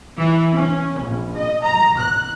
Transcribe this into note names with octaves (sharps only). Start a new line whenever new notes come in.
E3
C#4
A#1
D#5
A#5
F#6